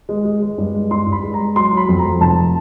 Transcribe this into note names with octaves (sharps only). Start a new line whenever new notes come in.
G#3
G#3
G#3
G2
G#3
G2 C6
G2
B5
G#3
A#5
G#3
F#3 C6
F#3 B5
F2
A#5
F2
F1 A5